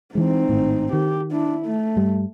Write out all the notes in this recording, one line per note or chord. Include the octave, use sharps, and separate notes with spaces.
E3 G#3 C4 D#4
G#1 A2
D#3 G4
D4 E4
A3
G2 G3